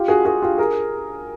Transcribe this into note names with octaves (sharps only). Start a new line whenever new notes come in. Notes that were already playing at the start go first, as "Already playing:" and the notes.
Already playing: F4 G4
F#4 G#4
F#4 G#4
F4 G4
G#4 A#4